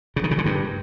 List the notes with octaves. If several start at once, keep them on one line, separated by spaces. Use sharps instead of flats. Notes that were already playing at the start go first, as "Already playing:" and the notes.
C#3
D#3
C#3
D3
G2